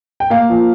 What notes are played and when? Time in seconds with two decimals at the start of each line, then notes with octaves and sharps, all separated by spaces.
0.20 G5
0.30 A#3 F5
0.50 F3